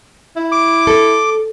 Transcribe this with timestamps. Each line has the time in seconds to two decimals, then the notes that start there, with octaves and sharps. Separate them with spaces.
0.36 E4
0.52 D6
0.87 A4